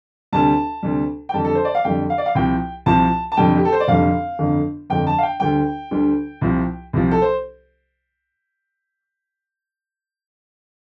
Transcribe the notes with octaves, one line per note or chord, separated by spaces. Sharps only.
D2 C3 G3 A5
D2 C3 G3
G5
F2 D3 G3 A5
A4
C5
D5
F5
F2 D3 G3 G5
F5
D5
F5
C2 C3 F3 G5
C2 C3 F3 A5
A5
F1 F2 D3 G3 G5
G4
A4
C5
D5
F1 F2 D3 G3 F5
G1 F2 D3
G1 F2 D3 G5
A5
F5
G5
D2 D3 G3 G5
D2 D3 G3
C2 C3 F3
C2 C3 F3
A4
C5